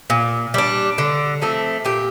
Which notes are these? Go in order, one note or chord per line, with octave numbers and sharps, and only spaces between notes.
A#2
G3 D4
D3
F3 A3 C4
A#2 G4